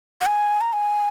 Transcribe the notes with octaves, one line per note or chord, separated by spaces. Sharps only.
F#5
G#5
A#5
G#5